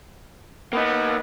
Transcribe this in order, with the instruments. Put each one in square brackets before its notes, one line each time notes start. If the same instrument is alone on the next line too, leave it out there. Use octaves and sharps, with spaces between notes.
[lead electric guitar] A#3 D#4 [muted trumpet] B3